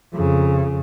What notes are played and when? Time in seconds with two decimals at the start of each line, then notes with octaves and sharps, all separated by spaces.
0.13 F2 C#3